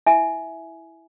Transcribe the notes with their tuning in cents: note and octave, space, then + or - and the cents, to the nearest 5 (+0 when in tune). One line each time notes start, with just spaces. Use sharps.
E4 +0 E5 +0 G#5 +15